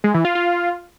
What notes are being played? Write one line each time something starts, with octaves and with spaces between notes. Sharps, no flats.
G#3
E3
F4
F4